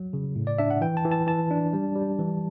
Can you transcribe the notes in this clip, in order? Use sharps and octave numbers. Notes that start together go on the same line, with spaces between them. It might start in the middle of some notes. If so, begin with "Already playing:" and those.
Already playing: F#3
C#3
A2
D5
D4 E5
F#5
E3 G5
A5
E3
A5
E3 A5
D4
G3
G3
E3